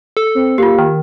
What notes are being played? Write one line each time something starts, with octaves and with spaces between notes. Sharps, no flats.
A4
C4
A#3 F4 G4
D#3